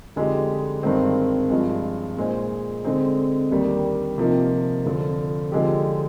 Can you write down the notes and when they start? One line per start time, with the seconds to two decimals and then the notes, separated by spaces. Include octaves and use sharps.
0.16 F2 D3 G#3 D#4 G4
0.83 G2 D#3 G#3 C4
1.50 G2 F3 G#3
2.17 A#2 G#3 D#4 G#4 C5
2.85 D3 G#3 C4 D#4
3.51 D#2 D#3 G3 D4
4.18 C3 F3 A#3 D#4
4.85 F2 D3 F3
5.52 D3 F3 G#3 D#4 G4